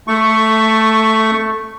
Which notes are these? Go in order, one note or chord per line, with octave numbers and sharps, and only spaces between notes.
A3 C#6